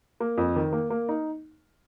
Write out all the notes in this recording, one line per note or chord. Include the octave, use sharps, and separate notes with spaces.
A#3
F2
D#3
A#3
A#3
D#4